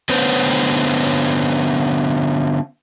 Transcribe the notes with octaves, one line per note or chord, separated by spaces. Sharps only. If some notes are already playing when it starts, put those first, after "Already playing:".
D3 B3 C#4 B4 C5